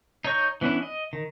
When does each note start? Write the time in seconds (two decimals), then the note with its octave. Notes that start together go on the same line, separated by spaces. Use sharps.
0.25 D#4 C#5 A#5 C#6 G6
0.61 E3 B3 C#4 D4 E4
0.82 D#5
1.13 D#3